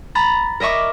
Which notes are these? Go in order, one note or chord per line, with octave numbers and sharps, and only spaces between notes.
A#5 B5 A6
A#4 D#5 E5 C#6 D6